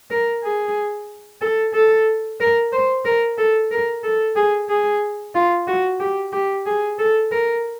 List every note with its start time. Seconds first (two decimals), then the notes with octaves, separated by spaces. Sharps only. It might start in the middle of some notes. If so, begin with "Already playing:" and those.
0.11 A#4
0.44 G#4
1.41 A4
1.74 A4
2.40 A#4
2.73 C5
3.05 A#4
3.38 A4
3.71 A#4
4.03 A4
4.36 G#4
4.69 G#4
5.35 F4
5.67 F#4
6.00 G4
6.32 G4
6.66 G#4
6.99 A4
7.32 A#4